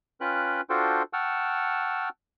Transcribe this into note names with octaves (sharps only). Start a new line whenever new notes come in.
C#4 F4 B4 G5 F#6
D4 F4 F#4 A4 C5 G5
F#5 G5 A5 C#6 E6 F6